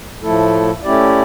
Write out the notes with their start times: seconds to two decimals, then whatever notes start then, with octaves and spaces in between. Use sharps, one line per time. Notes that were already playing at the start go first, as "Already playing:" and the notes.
0.22 A2 F3 A3 E4 A4
0.83 A3 C#4 E4 G4 D5